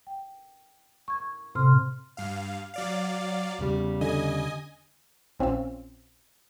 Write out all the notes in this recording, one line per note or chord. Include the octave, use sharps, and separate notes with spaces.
G5
C#6 G#6
A2 C3 C4 C6 F6
G2 F5
F#3 D5 F5
E2 C#3 G3
D3 D#5 G#5
A#1 C4 C#4 F4 E6